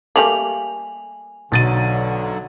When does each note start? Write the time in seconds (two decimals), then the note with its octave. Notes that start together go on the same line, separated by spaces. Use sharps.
0.16 G3 A3 A#3 G#5 F7 F#7
1.52 B1 D3 F#3 A6 D#7